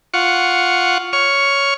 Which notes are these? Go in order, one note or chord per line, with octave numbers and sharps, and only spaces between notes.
F4 F#5 C#6
C#5 C#6 F6